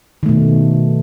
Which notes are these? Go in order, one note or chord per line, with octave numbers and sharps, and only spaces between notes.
B2 D#3 A3